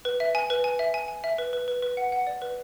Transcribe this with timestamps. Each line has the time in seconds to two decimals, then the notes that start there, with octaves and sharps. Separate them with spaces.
0.05 B4
0.20 E5
0.35 G#5
0.50 B4
0.64 G#5
0.79 E5
0.94 G#5
1.08 G#5
1.24 E5
1.38 B4
1.53 B4
1.68 B4
1.82 B4
1.97 F#5
2.12 F#5
2.27 D5
2.42 B4